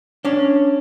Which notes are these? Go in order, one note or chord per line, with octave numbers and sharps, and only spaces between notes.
C#4 D4